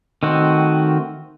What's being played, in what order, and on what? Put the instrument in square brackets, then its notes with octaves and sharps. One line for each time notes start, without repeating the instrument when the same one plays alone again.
[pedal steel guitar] D#3 A3 C4 F#4